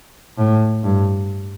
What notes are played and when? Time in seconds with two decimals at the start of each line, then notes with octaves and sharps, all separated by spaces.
0.38 A2
0.83 G2